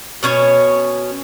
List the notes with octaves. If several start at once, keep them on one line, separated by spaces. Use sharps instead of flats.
B2 C#4 C#5 G#5